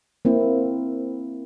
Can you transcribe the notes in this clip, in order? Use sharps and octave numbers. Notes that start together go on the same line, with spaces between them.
A#3 C4 E4